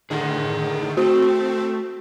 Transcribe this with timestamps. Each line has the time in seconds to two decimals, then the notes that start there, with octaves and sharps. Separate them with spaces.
0.10 A2 D3 D#3 G#4 F#5
0.97 A3 C4 F#4